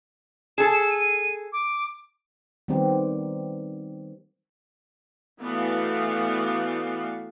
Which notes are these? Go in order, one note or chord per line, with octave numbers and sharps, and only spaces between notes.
G#4 A4 E7
D#7
D6
D#3 G3 B3 C4 G4
E3 A3 B3 F#4 D5 F5